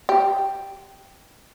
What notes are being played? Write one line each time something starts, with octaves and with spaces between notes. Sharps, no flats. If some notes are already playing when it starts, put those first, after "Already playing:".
G4